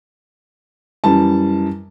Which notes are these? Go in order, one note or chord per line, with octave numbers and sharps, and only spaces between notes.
F#2 E3 G3 A5